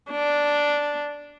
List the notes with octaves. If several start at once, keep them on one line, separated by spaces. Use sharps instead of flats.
D4